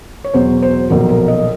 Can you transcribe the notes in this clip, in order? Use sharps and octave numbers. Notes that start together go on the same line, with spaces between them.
C#5
E2 B2 F#3 C5
C5
B1 A#2 F3 A#4
A#4
D#5